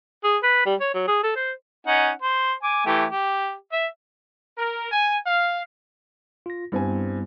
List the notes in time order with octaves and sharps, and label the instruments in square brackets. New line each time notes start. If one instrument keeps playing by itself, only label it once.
[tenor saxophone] G#4
B4
G3
C#5
F#3
G#4
A4
C5
[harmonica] C#4 D#4 F#5
C5
G#5 D6
E3 A3 G4
G4
E5
[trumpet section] A#4
G#5
F5
[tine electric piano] F4 A#6
[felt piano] G2 C4 G#5 [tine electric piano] G3 B3 E4